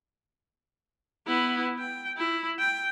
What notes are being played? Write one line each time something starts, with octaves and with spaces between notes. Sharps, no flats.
B3 E4
G5
E4
G5